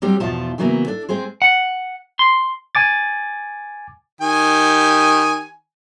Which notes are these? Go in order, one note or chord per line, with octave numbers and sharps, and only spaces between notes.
F#3 G3 C4 G4
E2 B2 F3 E4 F4 A5
C#3 E3 F#3 A#3 B3
D4 A4
G#3 C4 G#4 C5
F#5
C6
G#5 D6 A6
D#3 G4 G#5